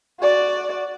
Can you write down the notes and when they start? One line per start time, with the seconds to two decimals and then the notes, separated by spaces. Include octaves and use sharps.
0.20 F#4 D5